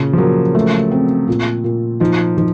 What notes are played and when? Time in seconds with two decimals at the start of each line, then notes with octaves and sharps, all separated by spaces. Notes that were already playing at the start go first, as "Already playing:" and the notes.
Already playing: A#2 C#3
0.13 F3
0.18 F#3 A#3
0.55 A3
0.91 C4
1.28 A#2
1.64 A#2
2.00 F3 D#4
2.37 F3 D#4